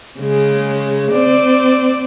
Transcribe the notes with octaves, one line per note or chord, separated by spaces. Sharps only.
C#3 G#3
C4 D5